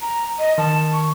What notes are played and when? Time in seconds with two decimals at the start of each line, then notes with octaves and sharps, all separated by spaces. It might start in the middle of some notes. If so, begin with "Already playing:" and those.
0.01 A#5
0.39 D#5
0.58 D#3 A5
0.93 C#6